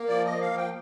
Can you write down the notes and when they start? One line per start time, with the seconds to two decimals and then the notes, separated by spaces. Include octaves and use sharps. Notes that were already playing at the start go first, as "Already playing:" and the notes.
Already playing: A#3
0.08 F3 D5
0.25 D#5
0.31 A#3
0.41 F5
0.52 F3 G5